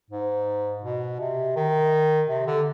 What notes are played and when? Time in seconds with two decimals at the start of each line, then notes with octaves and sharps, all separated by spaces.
0.10 G#2
0.83 B2
1.19 C3
1.56 D#3
2.29 C3
2.47 D3